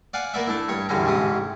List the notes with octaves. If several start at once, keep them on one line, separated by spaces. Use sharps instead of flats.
D5 F5 F#5 G#5
A#3 B3 D5 E5
A3 D4 E4
G2 C#5 C#6
A1 E2 D3 G3 C#4 A#5
A1 G#2 C3 C#4 D#6